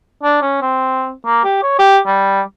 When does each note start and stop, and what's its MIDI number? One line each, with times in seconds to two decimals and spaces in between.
0.23 0.41 62
0.42 0.61 61
0.62 1.11 60
1.26 1.42 58
1.44 1.59 67
1.63 1.74 73
1.79 1.98 67
2.07 2.41 55